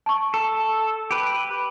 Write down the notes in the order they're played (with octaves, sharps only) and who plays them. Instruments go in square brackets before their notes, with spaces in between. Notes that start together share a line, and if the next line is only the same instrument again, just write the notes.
[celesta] A5 C#6
[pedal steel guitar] A4
G4 B4